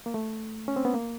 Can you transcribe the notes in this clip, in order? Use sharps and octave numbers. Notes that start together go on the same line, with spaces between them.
A#3
A3
C#4
C4
B3
A#3